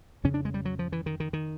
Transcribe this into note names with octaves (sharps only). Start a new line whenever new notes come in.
F2 C#3 C#4
D4
G#3
G3
F#3
F3
E3
D#3
D#3
D#3